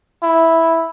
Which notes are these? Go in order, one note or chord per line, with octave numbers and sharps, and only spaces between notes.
E4